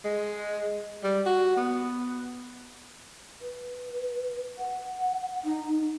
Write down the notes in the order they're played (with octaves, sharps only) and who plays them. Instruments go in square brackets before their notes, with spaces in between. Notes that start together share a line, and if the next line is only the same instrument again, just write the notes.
[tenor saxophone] G#3
G3
F#4
B3
[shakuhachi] B4
F#5
D#4